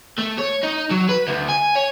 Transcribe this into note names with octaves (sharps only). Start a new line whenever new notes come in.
A3
C#5
D#4
F#3
B4
D2
G#5
C#5